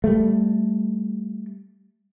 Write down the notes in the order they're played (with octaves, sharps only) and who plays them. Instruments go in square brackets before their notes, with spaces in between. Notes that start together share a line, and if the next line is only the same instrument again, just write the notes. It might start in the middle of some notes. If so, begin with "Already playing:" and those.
[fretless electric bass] G3 A3